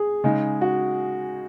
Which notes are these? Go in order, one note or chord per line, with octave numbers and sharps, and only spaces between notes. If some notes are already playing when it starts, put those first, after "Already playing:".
Already playing: G#4
C#3 G#3 D#4
F#4